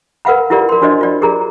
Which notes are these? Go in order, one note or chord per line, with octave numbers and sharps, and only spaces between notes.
A#4 B4 F5 F#5 B5
E4 F4 G4 A#4 D5
A#4 C6
D4 F#4 C5 D5 D#5
F4 D5
G4 G#4 A#4 A#5